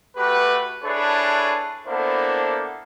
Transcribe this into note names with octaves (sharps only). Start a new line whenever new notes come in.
A3 F#4 G4 B4
D4 E4 G#4 A4 B4 C#5
A#3 B3 D4 E4 A4 C5